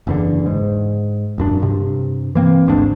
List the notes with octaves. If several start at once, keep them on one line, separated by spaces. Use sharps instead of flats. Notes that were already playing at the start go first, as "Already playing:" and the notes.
F#1 E2 D3
G#2
D#1 F#2 D4
G2 C3
E3 A#3 C4
G#1 D2 G#2 D4